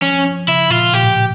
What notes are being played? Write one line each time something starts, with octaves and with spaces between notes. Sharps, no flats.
F3 C#4
F3
C#3 E4
A#2 F4
A#2 G4
A2